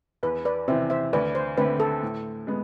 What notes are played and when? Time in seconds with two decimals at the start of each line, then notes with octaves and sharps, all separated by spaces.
0.23 E2 B4
0.45 B4 D5
0.68 C3 E3 C5 E5
0.90 C5 E5
1.13 D2 B4 D5
1.35 C5
1.57 D3 A3 C4 B4
1.80 A4
2.02 A2
2.47 G#3 B3